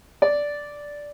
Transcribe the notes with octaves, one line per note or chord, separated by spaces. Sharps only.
D5